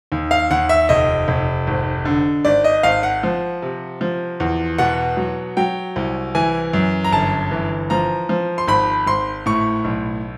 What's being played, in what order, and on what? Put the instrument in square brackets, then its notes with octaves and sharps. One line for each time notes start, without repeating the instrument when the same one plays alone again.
[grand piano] D#2
F5
D#2 F#5
E5
F1 D#5
F1
G#1
D3
G#1 D5
D#5
G#1 F5
F#5
F3
C3
F3
E2
B2 F#5
F#3
F#3 G5
C2
E3 G#5
F#2
A#5
G1 A5
E3
F3 A#5
F3
C6
G#1 B5
G#1 C6
A2 C#6
B1